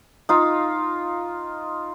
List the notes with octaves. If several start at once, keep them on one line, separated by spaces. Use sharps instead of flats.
D#4 F4 F5